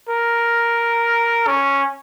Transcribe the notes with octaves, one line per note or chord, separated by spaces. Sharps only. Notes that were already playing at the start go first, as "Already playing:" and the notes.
A#4
C#4